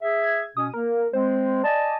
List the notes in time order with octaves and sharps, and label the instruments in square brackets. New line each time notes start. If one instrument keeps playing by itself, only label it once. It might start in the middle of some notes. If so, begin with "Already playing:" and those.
[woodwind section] G#4 E5
[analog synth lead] G#6
[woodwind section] B2 C#4 [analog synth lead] D#6
[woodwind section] A#3 [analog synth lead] A#4
[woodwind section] G#3 C4 [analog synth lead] C5
[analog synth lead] D5 [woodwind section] D#5 G#5 A5